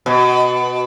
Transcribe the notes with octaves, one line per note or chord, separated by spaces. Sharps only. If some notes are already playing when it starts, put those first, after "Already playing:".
B2